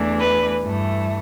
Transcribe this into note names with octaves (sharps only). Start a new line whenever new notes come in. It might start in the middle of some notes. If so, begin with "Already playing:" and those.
Already playing: E2 E3 A3 D4
B4
G2 E3 A3